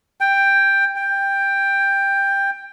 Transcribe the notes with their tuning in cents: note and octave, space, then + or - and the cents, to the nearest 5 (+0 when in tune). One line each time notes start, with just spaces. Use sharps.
G5 +10
G5 +10